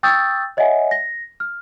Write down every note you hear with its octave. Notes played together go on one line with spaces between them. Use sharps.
G5 C#6 D#6 E6 G6 A6
C#5 D#5 E5 F#5 G#5
A#6
F6